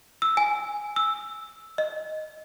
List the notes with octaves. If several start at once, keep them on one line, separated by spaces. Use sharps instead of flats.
E6
G#5
E6
D#5